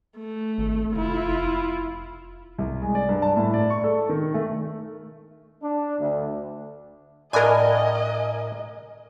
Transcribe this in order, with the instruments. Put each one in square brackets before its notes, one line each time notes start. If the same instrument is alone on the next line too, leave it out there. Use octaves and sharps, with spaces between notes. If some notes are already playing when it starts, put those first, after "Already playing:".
[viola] A3
[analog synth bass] G#1
[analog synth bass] F1 [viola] E4 F4
[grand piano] C2
G#3
D5
G2
A5
A2
D5
C#6
A4
D#3
A3
[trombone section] D4
D2
[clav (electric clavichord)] A2 D4 [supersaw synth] A#4 G#5 [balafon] D5 [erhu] D#5